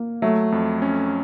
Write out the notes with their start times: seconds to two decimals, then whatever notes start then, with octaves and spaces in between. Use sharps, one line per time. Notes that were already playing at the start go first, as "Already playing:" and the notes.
Already playing: A#3
0.22 F#3 A3
0.52 F2
0.82 C#4